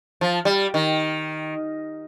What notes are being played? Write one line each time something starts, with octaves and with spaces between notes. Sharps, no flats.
F3
G3
D#3